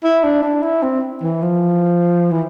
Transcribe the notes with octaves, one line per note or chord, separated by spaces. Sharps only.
E4
D4
D4
E4
C4
E3
F3
E3